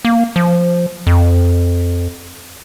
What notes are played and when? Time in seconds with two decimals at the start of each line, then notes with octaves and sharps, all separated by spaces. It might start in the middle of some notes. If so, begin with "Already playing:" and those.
0.05 A#3
0.36 F3
1.07 F2